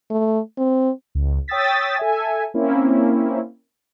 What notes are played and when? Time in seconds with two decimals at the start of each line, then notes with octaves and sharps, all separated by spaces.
0.10 A3
0.58 C4
1.15 C#2
1.48 C#5 G5 D#6 E6 A6 B6
1.97 A4 E5 G#5
2.54 A#3 C4 C#4 E4